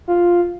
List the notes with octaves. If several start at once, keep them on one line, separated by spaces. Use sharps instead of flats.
F4